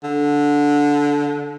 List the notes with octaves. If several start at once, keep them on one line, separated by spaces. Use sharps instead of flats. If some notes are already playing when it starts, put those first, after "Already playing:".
D3